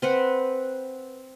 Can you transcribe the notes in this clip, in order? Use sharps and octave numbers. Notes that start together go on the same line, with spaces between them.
C4 B4 F#5